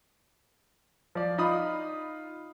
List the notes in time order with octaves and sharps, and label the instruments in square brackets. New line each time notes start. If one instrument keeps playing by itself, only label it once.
[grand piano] F3 D5
D#4 F4 B5 D#6